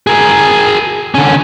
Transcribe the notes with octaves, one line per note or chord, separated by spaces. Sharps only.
G#4 A#4
D3 C#4